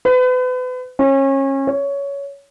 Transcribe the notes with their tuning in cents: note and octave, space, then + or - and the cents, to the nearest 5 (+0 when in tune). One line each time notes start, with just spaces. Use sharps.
B4 +35
C#4 -30
C#5 +15